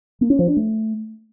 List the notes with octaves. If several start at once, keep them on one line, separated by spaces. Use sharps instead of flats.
A#3
C#4
F3
D4
A3